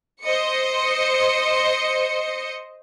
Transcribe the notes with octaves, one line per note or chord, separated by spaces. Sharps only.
C5 D#5 C#7